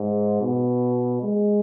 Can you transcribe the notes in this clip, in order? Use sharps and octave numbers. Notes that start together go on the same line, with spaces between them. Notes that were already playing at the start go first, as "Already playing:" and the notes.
Already playing: G#2
B2
G#3